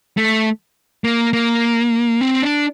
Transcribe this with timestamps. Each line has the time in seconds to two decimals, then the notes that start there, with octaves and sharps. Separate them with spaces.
0.17 A3
1.04 A#3
1.33 A#3
2.21 C4
2.42 D4